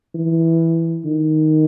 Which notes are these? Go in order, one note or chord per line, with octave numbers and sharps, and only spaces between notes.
E3
D#3